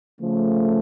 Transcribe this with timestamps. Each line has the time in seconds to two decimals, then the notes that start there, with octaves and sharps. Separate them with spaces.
0.21 C#3 F3 A3